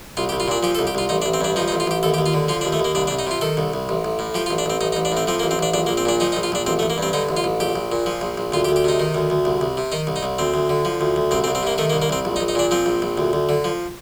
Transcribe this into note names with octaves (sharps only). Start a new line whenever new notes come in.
C2 F4
G4
C2
F4
A#2 D4
F3 G4
A4
C2
G4
C2 F4
A1 D#4
D4
A1
C4
G2 D4
F3 D#4
D#4
A1
F4
A1 G4
D#2 A4
G4
D#2
F4
D3
F3 F4
D4
D#2
A3
D#2
A#3
C2 D4
D4
C2
D#4
C3 F4
D#3 A4
C2
C2
A1
A1
A2
F3 G4
F4
A1
D4
A1 C4
A1 D#4
D#4
A1
D4
A2 C4
F3 C4
A#3
A1
C4
A1 D4
A#1 D4
A#3
A#1
C4
A#2 D4
F3 D#4
D#4
A#1
F4
A#1 D4
A1 C4
A3
A1
A#3
G2 C4
D3 D#4
A1
F4
A1
A#1 G4
A#1
A#2
F3
A#1
A#1
D2 F4
G4
D2
G4
C3 D#4
D#3
D2
D2
C2
C2
C3
D#3 D#4
C2
D#4
C2
D2 C4
D2
D3
F3
D2
D2
C2 C4
C4
C2
C4
C3 A#3
D#3 A3
A#3
C2
A#3
C2 C4
A#1
D#4
A#1
D#4
A#2 D4
F3 C4
A#1
A#1
D2
D2
D3
F3